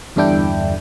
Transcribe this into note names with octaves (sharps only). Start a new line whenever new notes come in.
E2 G2 D3 D4 E4 G5